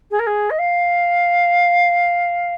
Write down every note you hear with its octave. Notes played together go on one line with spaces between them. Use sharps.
G#4
A#4
G#4
D#5
F5